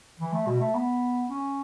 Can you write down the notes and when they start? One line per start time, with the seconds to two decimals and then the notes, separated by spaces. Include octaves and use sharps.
0.20 E3
0.33 A3
0.47 B2
0.60 A3
0.74 B3
1.28 C#4